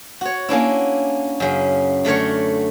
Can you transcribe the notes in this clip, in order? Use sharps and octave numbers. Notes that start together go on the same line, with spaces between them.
F#4 C#5
A#3 C#4 D4 E4
F#2 C#3
D3 A3 A#4 C#5